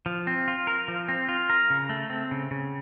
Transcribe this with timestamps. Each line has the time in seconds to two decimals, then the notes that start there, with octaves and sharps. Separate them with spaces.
0.06 F3
0.27 C4
0.48 F4
0.67 A#4
0.88 F3
1.08 C4
1.29 F4
1.50 A#4
1.70 C#3
1.89 A3
2.10 C4
2.31 C#3
2.51 C#3